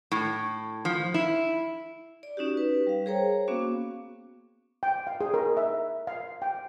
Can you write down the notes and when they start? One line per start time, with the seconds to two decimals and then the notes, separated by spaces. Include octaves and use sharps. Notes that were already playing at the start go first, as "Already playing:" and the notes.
0.12 A2
0.85 F3
1.14 E4
2.23 D5
2.37 C#4 D#4 F#4 G4
2.57 B4
2.87 G3 F5
3.06 G#4 A#4 C5 C#5 G5 A#5
3.48 A#3 B3 C#4 F#4 F5 D6
4.83 G5
5.07 F5
5.21 G#4
5.34 A#4
5.57 E5
6.07 F5
6.42 G5